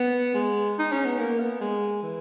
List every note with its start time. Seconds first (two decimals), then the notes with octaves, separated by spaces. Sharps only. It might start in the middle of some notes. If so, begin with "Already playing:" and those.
Already playing: B3
0.35 G#3
0.79 D#4
0.92 C#4
1.05 B3
1.19 A#3
1.40 B3
1.61 G#3
2.03 E3